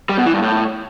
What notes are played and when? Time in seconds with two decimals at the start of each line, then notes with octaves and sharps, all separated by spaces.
0.09 G3
0.18 B2
0.26 E3
0.34 G2
0.42 A2